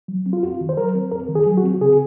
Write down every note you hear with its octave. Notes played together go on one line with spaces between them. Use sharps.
F#3
C4
F4
F2 F#4
D#3
C5
F#3 A#4
C4
F2 A#4
D#3
G#4
F#3
F#4
C4
C#3 G#4